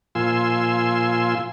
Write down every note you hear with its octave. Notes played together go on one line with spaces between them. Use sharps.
A#2 F3 F4 G#5 C6 E6